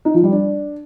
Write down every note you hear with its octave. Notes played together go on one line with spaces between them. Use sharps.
D#4
F3
G3
D4